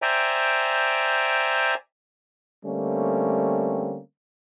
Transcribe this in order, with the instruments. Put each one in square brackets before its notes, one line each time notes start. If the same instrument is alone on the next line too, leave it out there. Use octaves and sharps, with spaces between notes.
[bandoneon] C5 D5 E5 G5 G#5 A#5
[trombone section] D3 G3 A3 A#3 C4 C#4